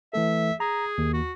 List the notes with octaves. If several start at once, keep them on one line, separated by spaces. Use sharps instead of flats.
E3 A3 A4 E5
G#4 A#5
D#2
F#4